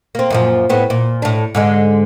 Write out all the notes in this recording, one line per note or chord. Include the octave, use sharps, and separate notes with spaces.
A#3 C4
F#2 A#2 F3
A2 B3 C4
A#2
A2 D4
G#2 D3 G#3